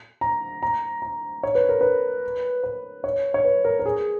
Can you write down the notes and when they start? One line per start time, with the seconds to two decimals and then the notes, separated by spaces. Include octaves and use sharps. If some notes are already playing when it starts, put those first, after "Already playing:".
0.21 A#5
0.63 A#5
1.02 A#5
1.43 C#5
1.55 B4
1.69 A#4
1.81 B4
2.64 B4
3.04 C#5
3.34 C#5
3.45 B4
3.65 A#4
3.79 A#4
3.86 G#4